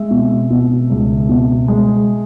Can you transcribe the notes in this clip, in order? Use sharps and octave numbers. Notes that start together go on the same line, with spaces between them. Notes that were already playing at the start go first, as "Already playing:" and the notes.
Already playing: G#3 E5
B2
B2
C#2
B2
G#3